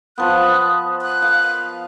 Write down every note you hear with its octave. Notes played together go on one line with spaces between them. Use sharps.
F3 B3 F#6
F#6
F5